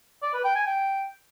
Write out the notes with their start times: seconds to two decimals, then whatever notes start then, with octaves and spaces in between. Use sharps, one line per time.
0.23 D5
0.34 B4
0.45 G5
0.56 G#5
0.67 G5